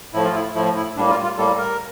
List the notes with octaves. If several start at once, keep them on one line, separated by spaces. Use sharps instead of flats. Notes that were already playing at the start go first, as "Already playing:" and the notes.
A2 F3 A3 E4
F4
E4
A2 F3 A3 E4
E4
A2 G3 A#3 D4
F4
F4
A2 G3 A#3 A4
A#4